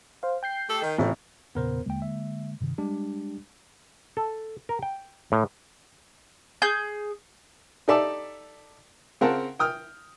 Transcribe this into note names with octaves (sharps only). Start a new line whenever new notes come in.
C5 F5
G5 G6 C7
A3 G4 A4
D#3
A1 F2
E2 A#2 C#3 B3 A#4 C5
D#2 D3 G#3 A#3 G5
E5
G2 C3 D#3
G3 G#3 D4 G4
A4
A#4
G5
A2
G#4 G6
D#4 G4 A4 D5 E5 A5
C#3 C4 A#4 F5 F#5 A5
G5 D#6 F6